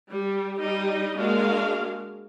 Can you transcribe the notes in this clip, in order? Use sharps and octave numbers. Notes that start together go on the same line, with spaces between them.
G3
G3 D#4 D#5
G#3 A#3 D4 F#4 A#4 F5